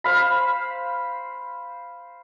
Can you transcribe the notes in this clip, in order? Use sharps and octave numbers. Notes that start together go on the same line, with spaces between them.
C5 F5 B5